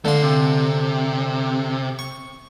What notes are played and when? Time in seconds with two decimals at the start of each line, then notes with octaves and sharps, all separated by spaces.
0.05 D3 A3 F5 C6
0.22 C3
1.99 C#6